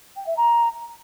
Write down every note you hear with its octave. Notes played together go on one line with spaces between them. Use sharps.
G5
E5
A#5